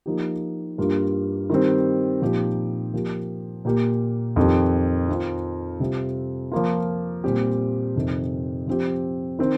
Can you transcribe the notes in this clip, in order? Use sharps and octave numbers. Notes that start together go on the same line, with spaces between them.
F3 A#3 D#4 G4
G2 G3 A#3 F4
D#3 G3 C4
A#2 F3 D#4 G4
F3 A#3 G4
A#2 A#3 G4
F2 D#3 C4 G4
D#3 C4 F4
C3 G3 C4 F4
F3 A#3 F4
A#2 G3 C4 G4
F2 C3 D#3 C4
F3 C4 G4
D#3 C4